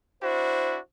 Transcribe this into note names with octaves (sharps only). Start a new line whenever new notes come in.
D4 E4 F#4 C5